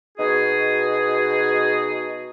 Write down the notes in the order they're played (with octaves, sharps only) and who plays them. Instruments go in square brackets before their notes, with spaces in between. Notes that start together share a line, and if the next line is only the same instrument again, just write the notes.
[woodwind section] B2 D#4 F#4 G#4